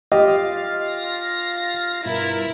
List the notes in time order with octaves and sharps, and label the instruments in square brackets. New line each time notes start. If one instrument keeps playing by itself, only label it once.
[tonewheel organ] F4 F5 [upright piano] G4 [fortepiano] D#5
[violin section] A#6
[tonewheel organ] G2 B2 F4 [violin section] E4 A#4